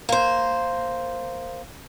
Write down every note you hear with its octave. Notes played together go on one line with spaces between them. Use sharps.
A#3 C5